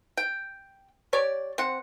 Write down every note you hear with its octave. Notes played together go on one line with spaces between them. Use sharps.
G5
G4 C#5 D5
C4 F#5